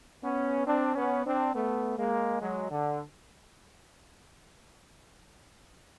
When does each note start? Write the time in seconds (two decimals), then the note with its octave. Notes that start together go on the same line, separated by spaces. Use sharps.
0.23 B3 C#4
0.66 C4 D4
0.95 B3 C#4
1.25 C4 D4
1.54 A3 B3
1.97 G#3 A#3
2.41 F#3 G#3
2.71 D3